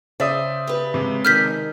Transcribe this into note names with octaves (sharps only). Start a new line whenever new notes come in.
C#3 C5 D5 E5 D#6
G4 B4
C3 G#3
F2 D#3 F6 G6 B6